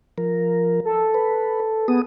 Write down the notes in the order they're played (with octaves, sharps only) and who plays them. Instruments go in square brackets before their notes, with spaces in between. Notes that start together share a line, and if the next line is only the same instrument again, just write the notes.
[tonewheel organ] F3 A#4
[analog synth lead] A4
[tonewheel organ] B4
[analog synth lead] B3 [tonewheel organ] G#4 A4 D#6